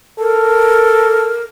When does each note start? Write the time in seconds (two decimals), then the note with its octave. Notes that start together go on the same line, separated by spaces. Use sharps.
0.19 A4 A#4